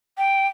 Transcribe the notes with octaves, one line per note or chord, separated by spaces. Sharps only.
G5